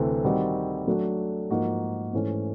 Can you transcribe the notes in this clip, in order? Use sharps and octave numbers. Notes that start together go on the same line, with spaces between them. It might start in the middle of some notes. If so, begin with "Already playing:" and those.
Already playing: D2 C3 E3 A3 C4
D#3 G3 C4 D#4 F#4
F#3 A3 D4 F#4
G#2 F3 A#3 D#4 F#4
G#2 E3 A3 C#4